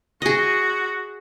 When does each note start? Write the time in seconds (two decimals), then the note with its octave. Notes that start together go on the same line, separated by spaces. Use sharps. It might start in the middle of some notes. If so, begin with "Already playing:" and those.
0.22 F#4 G#4 D#5